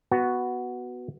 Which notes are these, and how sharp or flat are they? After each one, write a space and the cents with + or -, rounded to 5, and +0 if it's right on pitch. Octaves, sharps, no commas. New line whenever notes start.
B3 +0 F#4 +0